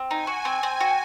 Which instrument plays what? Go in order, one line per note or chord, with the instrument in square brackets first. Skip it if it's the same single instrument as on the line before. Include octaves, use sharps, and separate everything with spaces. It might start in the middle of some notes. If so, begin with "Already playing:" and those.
Already playing: [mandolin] C4
[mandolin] D#4 [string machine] G#5
[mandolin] F#4
C4
C4
F#4